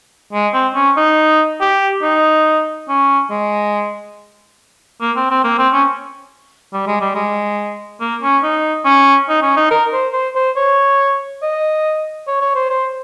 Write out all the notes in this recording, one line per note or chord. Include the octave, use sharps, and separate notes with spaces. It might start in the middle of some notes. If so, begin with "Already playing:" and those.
G#3
C4
C#4
D#4
G4
D#4
C#4
G#3
A#3
C4
C4
A#3
C4
C#4
G3
G#3
G3
G#3
A#3
C#4
D#4
C#4
D#4
C#4
D#4
A#4
C5
C5
C5
C#5
D#5
C#5
C#5
C5
C5